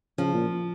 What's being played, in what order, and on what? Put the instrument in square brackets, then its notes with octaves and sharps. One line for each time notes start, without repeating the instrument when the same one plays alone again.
[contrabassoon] C#3 [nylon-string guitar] F3
[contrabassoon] A#2